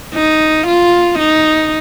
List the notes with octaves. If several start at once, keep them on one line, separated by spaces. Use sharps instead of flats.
D#4
F4
D#4